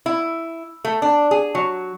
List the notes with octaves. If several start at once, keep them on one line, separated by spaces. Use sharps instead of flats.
E4
A3
D4
G#4
F#3